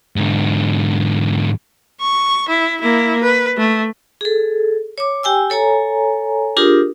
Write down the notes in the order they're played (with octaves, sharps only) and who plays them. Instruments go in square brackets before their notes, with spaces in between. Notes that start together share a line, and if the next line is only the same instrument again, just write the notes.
[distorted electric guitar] G#2 D3
[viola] C#6
E4
A#3 E4
B4
A3
[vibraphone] G#4 A4
C#5 D6
G4 G5 G#5 E6
A4 C#5 G#5 A#5
D4 F4 G4 G#4 A#4 D#6